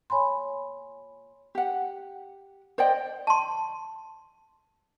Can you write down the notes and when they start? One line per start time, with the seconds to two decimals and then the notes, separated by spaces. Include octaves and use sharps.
0.10 C#5 G#5 B5 C6
1.55 G4 F#5
2.78 C5 D5 D#5 G5
3.27 A5 C6